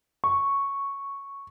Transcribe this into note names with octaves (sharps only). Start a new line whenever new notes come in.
C#6